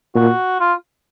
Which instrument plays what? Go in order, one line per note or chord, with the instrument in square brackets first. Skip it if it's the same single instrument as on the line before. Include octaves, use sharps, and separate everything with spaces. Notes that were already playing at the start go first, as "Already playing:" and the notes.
[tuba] A#2 [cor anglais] F#4
[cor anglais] F4